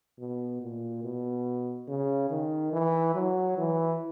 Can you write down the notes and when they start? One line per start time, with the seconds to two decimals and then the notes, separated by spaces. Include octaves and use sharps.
0.19 B2
0.62 A#2
1.03 B2
1.88 C#3
2.30 D#3
2.73 E3
3.15 F#3
3.57 E3